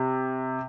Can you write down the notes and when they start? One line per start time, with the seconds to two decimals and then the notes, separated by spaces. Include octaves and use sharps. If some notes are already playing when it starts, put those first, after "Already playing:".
Already playing: C3